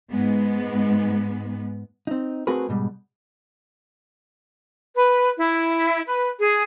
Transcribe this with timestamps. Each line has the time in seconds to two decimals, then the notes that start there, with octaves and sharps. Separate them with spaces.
0.12 G#2 G#3 B3
2.07 C4 D#4
2.47 A3 C4 F#4 G#4 A#4 B4
2.69 G#2 B2 G3
4.95 B4
5.37 E4
6.07 B4
6.39 G#4